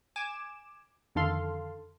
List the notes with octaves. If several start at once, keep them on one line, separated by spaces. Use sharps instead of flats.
G#5 D6 E7
F2 D3 D#3 A4 F5 C6